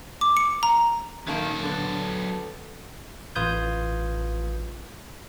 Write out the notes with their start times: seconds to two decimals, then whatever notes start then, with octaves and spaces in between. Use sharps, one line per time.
0.21 D6
0.37 C#7
0.63 A#5
1.27 F#2 D#3 F#3 A#3 A4
1.63 D3 B3
3.35 A1 F4 B4 D#6 G6 G#6